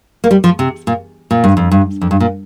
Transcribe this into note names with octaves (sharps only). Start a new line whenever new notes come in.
A#3
G3
F3
C3
A#2
A#2
G2
F2
G2
F2
G2
A#2